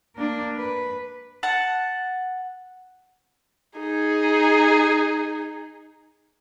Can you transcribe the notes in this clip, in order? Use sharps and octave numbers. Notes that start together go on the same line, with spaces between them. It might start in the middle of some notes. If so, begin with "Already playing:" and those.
A#3 D4
B4
F#5 A5
D#4 G#4